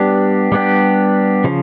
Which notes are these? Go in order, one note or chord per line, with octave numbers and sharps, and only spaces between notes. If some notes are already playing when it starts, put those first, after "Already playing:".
Already playing: G3 B3 D4 G4
G3 B3 D4 G4
C#3 F3